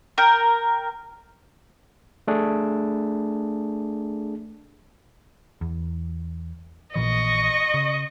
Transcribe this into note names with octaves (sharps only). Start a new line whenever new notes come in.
A#4 G5
A3 D4 G#4
E2
A#1 A#2 E3 D#5 C#6
C#3